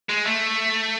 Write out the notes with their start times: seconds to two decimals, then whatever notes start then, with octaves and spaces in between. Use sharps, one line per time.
0.09 G#3
0.26 A3